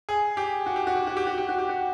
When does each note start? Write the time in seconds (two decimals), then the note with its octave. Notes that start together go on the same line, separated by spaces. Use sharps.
0.09 G#4
0.37 G4
0.66 F#4
0.76 G4
0.87 F#4
0.96 G4
1.07 F#4
1.17 G4
1.27 F#4
1.38 G4
1.49 F#4
1.58 G4
1.69 F#4